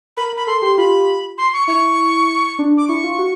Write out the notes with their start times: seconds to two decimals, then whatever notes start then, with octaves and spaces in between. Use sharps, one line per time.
0.17 A#4 B5
0.33 A#4
0.37 B5
0.47 A4 C6
0.62 G4 C6
0.77 F4 B5
1.38 C6
1.53 C#6
1.67 E4 C#6
2.59 D4
2.77 D6
2.88 E4 C#6
3.03 F4
3.18 F#4